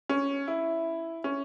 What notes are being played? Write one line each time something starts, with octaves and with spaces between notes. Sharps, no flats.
C#4
E4
C#4